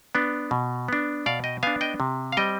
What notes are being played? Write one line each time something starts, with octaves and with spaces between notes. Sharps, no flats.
B3 D4
B2
B3 D4
B2 D5 F5
D#5 G5
B3 D4 F5 G#5
D#5 G5
C3
F5
G3 C4 D#5 G5